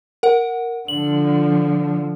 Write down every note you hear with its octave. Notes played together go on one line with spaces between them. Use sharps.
A#4 F#5
D3 F3 F#7